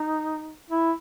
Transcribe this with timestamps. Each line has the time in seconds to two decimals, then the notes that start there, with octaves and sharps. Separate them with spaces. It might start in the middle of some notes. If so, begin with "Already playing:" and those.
Already playing: D#4
0.70 E4